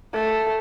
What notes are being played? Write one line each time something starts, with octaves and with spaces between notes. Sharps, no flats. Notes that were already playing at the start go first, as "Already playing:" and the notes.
A3